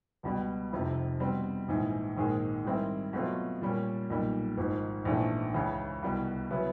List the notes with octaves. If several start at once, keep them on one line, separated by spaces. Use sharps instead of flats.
C#2 B2 G3
F1 F2 C3 F3
B2 G3 C4
A#1 G#2 E3
A#1 G#2 D#3 G#3
G#2 D#3 G3 C4 E4
B2 F#3 A3 C4 F4
A#2 G3 A#3 C#4
B1 A#2 G3
G#1 G#2 F3
A#1 G#2 E3 A3 D4
C#2 C#3 E3
C2 B2 G3
C#3 F#3 B3 E4